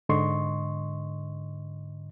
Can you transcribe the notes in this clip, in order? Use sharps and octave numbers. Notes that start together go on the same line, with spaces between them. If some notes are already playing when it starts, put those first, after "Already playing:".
G#2 D3 D#5 C6 C#6